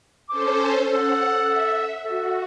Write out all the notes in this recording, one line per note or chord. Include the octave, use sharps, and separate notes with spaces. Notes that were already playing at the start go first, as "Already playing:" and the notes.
C#4 A4 C5 D6
A4 F#5
E5
F#4 A4